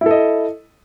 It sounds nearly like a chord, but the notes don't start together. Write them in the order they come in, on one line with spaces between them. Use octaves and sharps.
E4 A4 D#5